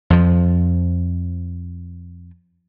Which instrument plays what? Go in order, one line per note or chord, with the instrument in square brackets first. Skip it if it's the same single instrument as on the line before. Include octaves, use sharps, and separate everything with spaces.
[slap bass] F2 F3